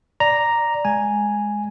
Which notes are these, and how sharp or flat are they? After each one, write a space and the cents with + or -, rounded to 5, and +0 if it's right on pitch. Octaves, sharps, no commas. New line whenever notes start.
D5 +0 A#5 +0
G#3 +0 G#5 +0